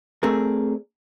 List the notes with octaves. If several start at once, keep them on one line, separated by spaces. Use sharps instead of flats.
A3 C4 D4 G#4 A#4